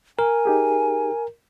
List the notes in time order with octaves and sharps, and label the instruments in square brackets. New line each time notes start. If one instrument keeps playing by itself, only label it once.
[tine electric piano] A#4 [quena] G#5
[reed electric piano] D#4 G4 G#4